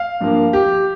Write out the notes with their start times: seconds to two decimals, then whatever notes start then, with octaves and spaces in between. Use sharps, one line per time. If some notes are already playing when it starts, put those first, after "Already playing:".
Already playing: F5
0.21 G2 F3 A#3
0.53 G4